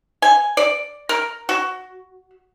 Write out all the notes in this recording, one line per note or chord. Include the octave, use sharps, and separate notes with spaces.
G#5
D5
A#4
F#4